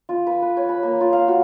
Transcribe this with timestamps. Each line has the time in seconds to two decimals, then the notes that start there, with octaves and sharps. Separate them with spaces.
0.09 F4
0.27 B4
0.42 B4
0.57 C#5
0.69 B5
0.83 A#3
1.01 F4
1.13 F5
1.28 F#4